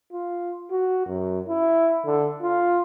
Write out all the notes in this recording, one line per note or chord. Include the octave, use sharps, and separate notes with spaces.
F4
F#4
F#2
E4
D3
F4